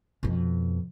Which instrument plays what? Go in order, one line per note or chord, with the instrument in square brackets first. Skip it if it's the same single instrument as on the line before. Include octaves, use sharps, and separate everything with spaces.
[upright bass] F2 B2